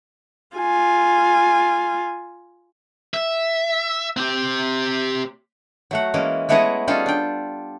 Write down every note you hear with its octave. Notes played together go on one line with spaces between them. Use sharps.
F4 G#5
E5
C4 G4
F#3 A3 F#5
E3 G#3 A#3 C#4
G#3 A3 B3 E4 C#5 D#5
G3 C#4 D#4 F4 G#4 A4
D4 G5